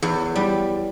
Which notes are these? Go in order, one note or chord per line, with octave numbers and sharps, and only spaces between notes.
E2
G3